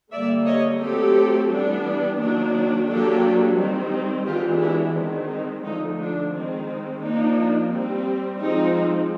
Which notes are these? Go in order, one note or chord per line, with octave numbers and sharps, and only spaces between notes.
D3 G3 A#3 D5 E5
C#5 D#5
F#3 A3 C4 G4 A4
E3 G3 B3 D4
D#3 F#3 A#3 D4
F#3 A#3 D4 G4 A4
D#3 G3 C4
E3 G#3 B3 D4 F4 G4
E4 F#4
D#3 G#3 C4
D#4
D3 F3 A3 D#4
D4
D#3 G#3 C4
F3 A#3 D4 D#4
G3 C4
F3 G#3 C4 D#4